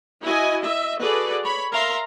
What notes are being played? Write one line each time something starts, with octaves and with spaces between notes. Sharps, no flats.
E4 F#4 D#5 G#5
D#5 E5
F#4 G#4 A4 B4 D5
C#5 B5
A#4 E5 F5 A#5 C6